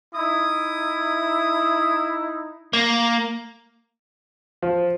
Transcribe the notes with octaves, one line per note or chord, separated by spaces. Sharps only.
D#4 E4 D#6
A#3
F3